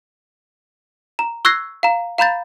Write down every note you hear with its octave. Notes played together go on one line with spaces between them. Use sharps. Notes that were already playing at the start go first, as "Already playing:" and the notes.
A#5
C#6 E6 F#6 G#6 A#6 C7
F5 A#5
F5 A#5 B5 G6 A6